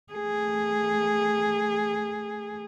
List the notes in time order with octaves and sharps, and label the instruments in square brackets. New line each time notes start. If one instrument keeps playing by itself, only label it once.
[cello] A3 G#4